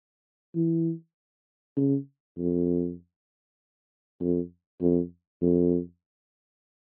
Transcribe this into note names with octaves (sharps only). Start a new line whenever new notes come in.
E3
C#3
F2
F2
F2
F2